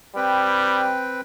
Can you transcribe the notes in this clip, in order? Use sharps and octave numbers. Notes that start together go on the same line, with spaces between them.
G3 C4 B4 G5